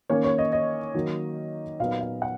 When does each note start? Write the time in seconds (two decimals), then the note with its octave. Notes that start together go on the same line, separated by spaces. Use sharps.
0.10 D#3 A#3 C#4 C#5
0.24 C#5
0.38 D#5
0.52 D#5
0.95 D#3 F#3 A#3
1.80 A#2 F#3 B3 D#4 F5
2.01 F5
2.22 F#5